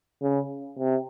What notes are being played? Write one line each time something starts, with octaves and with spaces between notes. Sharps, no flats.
C#3
C3